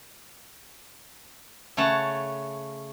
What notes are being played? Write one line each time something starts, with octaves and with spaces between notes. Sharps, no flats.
C#3 A3 C#5 F#5 A5